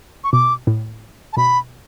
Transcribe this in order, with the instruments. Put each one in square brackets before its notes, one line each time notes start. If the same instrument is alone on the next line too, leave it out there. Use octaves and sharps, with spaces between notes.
[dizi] C#6
[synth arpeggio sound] B2 [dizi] D6
[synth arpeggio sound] A2
[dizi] A5
[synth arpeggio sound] B2 [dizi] B5